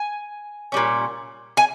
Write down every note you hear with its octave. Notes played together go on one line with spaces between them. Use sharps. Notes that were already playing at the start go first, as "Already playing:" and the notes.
Already playing: G#5
A#2 G3 C#4
G#5